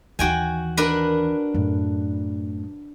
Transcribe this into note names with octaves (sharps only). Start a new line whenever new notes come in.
D#2 E3 F#4 G5 G#5
D4 A#4 B4
F#2 A2